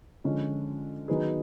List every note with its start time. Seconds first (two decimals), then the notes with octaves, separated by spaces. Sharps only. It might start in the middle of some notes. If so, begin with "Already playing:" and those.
0.24 D3 F3 G#3 C#4
1.08 D#3 F#3 B3 D#4 G#4